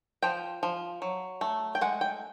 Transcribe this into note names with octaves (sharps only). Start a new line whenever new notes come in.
F3 G5
F3
F#3
A3
G5
G#3 F#5
G5